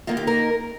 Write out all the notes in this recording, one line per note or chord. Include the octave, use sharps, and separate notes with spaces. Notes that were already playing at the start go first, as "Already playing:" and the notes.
D#2 D#3 A#3 D#4 F4
G4
A#4